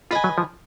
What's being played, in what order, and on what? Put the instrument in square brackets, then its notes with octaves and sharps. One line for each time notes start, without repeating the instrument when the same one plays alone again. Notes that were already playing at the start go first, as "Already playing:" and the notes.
[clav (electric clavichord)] F4 [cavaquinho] B4 D#5 G#5
[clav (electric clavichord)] F#3
F3